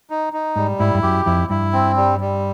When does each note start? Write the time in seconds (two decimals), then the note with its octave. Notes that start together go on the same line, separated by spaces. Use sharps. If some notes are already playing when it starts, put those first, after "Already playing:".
0.10 D#4
0.33 D#4
0.56 G#2 G3
0.80 G#2 E4
0.95 G2
1.03 F#2 G4
1.26 F2 E4
1.50 G2 E4
1.73 C4
1.97 G3
2.20 G3